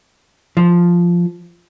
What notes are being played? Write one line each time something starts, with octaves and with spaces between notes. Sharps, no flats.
F3